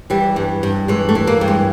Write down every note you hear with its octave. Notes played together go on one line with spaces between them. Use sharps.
E3 G3
G2
G2
E3 G#3
A3
E3
A#3
G2
G#3